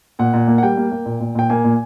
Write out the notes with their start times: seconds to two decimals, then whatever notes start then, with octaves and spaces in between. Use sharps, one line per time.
0.19 A#2 F#5
0.34 A#2
0.48 A#3
0.58 F#5
0.63 G3 G5
0.77 A#3
0.92 A#3
1.05 A#2
1.20 A#2
1.35 A#2 G5
1.50 A#3 G#5
1.64 A#2